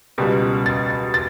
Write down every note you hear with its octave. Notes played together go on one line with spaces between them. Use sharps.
C#2 B2 G3
A6
A6